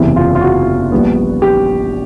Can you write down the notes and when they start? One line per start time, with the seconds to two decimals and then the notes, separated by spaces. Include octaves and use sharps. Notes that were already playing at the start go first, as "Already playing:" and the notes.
Already playing: F#1 E2 C3 E3 E4
0.16 F4
0.35 F4
0.41 F#4
0.92 A#1 A#2 G3 B3
1.42 G4